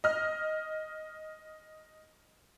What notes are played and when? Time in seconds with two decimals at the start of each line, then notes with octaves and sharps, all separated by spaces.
0.04 D#5 F6